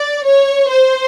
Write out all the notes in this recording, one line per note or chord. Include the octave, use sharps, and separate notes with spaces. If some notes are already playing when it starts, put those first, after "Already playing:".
Already playing: D5
C#5
C5